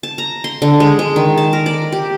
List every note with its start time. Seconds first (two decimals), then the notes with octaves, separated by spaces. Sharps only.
0.03 A5
0.18 A#5
0.44 C6
0.62 D3
0.80 G#3
0.99 G#3
1.16 D#3
1.37 A5
1.53 A#4
1.66 D5
1.92 G4